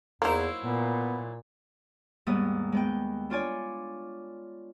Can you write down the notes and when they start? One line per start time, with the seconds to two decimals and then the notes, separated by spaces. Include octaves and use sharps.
0.22 E2 F#3 A#3 D#4 E4 C5
0.64 A#2 B3
2.27 D#2 G#2 G3 B3 D#6
2.72 G#3 B3 G5
3.30 D4 F4 C#5 D5 G#5